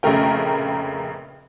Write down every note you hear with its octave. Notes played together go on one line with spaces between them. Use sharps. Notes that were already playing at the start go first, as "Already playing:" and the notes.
F1 A#1 C#3 A3 A#4 G5